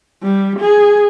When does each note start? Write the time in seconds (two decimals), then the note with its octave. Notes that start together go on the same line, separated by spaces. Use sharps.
0.23 G3
0.59 G#4